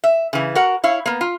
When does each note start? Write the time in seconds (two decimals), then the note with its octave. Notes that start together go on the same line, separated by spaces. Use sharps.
0.04 E5
0.33 C#3 E3
0.55 F#4 A#4 F#5
0.84 E4 C#5 F5
1.06 A#3 B3
1.21 F4